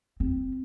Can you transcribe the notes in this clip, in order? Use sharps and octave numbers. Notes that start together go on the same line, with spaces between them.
C4